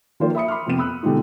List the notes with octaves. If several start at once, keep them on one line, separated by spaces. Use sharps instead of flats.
D#3 F3 A#3 F4 C5
E5 B5 D#6 C#7
B5 C6 D6 F6
F2 C3 B3 D#7
B5 D#6 E6 F#6
B2 D3 G3 G#3 D#4 F4